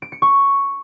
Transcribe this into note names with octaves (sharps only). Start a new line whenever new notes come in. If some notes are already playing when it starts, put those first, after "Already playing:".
D7
C#7
C#6